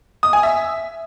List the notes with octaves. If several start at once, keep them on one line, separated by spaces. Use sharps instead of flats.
D#6
G#5
E5